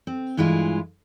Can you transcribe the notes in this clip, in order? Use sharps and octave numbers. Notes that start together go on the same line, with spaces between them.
C4
G2 E3 G#3 E4 F4